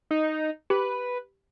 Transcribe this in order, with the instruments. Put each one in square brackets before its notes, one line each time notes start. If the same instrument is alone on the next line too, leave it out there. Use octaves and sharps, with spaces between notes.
[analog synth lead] D#4
[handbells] G4 [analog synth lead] B4